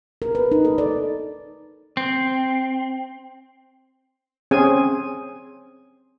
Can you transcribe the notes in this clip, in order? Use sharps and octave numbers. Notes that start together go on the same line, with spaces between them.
A#4
B4
D#4
A4
D5
C4
C4 C#4 G#4 G#5